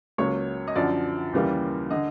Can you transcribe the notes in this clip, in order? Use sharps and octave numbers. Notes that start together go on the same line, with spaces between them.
C#2 C#3 F#3 A#3 C#5
D#5
F#2 D3 F3 D5
D#2 C#3 E3 G3 A#3
D3 D#5